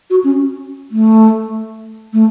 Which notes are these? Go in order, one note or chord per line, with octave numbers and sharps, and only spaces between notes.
F#4
C#4
A3
A3